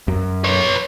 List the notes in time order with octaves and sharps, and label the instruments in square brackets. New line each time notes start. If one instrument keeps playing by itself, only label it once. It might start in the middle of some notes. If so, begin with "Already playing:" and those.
[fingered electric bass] F#2
[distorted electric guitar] B4 C#5